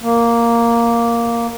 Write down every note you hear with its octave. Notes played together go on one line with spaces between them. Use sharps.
A#3